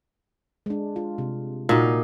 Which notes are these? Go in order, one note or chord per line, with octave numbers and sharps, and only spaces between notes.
G#3 D4
F4
C3
A#2 D#4 F#4 D#5 F5